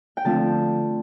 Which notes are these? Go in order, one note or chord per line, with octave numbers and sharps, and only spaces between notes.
G5
D3 F3 A3 C4 F4 A5